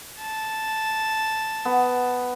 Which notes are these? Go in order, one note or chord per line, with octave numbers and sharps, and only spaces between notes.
A5
B3